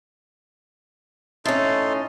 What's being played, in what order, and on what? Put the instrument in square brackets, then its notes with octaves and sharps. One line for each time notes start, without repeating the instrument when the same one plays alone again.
[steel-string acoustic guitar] A2 C#4 [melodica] D#4 A4 C6